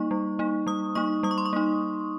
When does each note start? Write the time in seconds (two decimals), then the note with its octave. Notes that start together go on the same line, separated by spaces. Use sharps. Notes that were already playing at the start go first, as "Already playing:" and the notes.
Already playing: G3 A#3 D#4 C#6
0.11 G3
0.39 A#3 D#4
0.67 G3 D#6
0.95 A#3 D#4 C#6
1.23 G3 D#6
1.31 C#6
1.38 C6
1.46 C#6
1.53 A#3 D#4